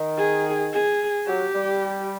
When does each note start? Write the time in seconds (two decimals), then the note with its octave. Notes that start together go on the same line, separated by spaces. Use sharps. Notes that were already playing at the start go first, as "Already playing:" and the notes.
Already playing: D#3
0.18 G#4
0.73 G#4
1.27 F#3 G4
1.55 G3